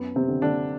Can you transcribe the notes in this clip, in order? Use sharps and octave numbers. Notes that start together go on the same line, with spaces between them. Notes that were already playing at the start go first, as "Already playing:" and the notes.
Already playing: F#2 B3
C3 C4
D3
D3 D4